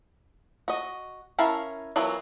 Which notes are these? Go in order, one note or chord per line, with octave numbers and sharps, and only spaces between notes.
F#4 D#5
C#4 E4 A#4 F5 A5
E3 F#3 B3 F4 A#4